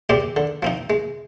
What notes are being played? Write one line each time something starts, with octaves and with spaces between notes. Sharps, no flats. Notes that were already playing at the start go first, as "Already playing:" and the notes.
G#3 C4 G4 D5
D3
F3 C4 D#4
G#3